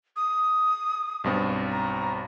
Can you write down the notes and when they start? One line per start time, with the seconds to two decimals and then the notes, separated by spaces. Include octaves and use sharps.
0.16 D#6
1.24 B1 G2 C4
1.71 A#5